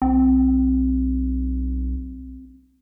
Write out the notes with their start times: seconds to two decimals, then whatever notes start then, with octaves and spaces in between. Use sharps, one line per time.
0.02 B1 C4